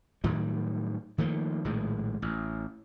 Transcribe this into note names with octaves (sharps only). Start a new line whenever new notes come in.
A2 D#3 F#3 G3
D#3 F3 A3 A#3
A#1 A2 D#3 G#3
A1